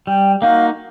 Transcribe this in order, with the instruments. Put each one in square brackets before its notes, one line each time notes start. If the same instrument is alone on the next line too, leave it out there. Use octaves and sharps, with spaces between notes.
[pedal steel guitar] G3 [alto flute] G5
[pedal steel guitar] A#3 D#4 F#4 [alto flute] F5